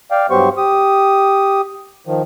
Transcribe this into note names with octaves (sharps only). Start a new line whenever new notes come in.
D5 F5 G5
G2 F#3 B3 G4 C5 C#6
G4 D#6
D#3 F3